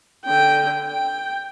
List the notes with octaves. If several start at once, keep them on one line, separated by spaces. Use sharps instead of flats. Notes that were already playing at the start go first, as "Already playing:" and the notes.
D3 G5
G5